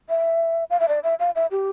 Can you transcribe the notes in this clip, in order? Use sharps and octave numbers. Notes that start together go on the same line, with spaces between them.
E5
F5
E5
D5
E5
F5
E5
G4